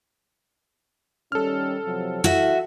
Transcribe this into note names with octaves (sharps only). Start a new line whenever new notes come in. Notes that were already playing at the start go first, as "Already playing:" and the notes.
D#3 G3 C#4 A4 F6
C3 F3 F#3
E4 F#4 E5